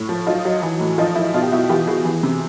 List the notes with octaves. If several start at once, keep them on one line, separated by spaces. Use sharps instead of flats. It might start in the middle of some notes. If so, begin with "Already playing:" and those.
Already playing: A2
F3
F#3 D#4 F4
F#3
E3
A2
F3 D#4 F4
F3 E4
B2 D#4 F4
G4
B2 E4 F#4
E3 F4 G4
E3 F#4 G#4
E3
C3